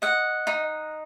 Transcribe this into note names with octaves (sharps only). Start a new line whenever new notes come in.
D#5 F#5
D#4